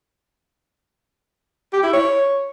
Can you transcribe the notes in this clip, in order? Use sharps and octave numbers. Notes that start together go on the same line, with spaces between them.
G4
E4
C#5